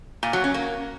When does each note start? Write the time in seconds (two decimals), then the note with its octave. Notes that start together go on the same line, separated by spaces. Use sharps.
0.23 A#2
0.33 F#3
0.44 C#4
0.54 A#3